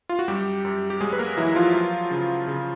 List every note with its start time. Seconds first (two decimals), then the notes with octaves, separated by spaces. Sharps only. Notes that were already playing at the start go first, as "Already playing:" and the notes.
0.09 F4
0.19 F#4
0.28 F#2 G3 G4
0.65 F#2
0.90 G4
1.01 F#3 G#3 G#4
1.13 B4
1.19 A#3 A#4
1.37 E3 F#3 E4
1.56 F3 F4
1.74 F#3
2.11 C#3
2.48 C#3